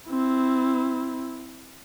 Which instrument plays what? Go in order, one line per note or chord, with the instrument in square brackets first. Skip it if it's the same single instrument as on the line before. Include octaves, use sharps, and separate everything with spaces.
[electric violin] C4 E4